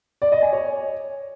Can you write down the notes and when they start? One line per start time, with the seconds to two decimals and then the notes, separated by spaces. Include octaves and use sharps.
0.22 D5
0.32 D#5
0.42 G#5
0.52 C#5